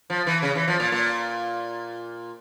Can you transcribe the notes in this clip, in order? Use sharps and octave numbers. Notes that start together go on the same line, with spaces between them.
F3
E3
C#3
E3
F3
A#2
A#2